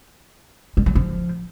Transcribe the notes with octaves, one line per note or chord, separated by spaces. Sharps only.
G3
F#3
F3